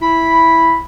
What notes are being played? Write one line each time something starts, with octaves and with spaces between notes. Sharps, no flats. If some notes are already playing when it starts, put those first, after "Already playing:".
E4 B5